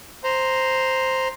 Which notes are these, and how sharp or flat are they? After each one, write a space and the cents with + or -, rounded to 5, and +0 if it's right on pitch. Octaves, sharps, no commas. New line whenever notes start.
C5 +0 A#5 +0